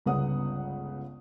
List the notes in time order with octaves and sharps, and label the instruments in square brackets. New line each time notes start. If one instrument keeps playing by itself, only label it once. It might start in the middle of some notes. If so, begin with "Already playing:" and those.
[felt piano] G1 C#2 C#3 B3 F#5 D#6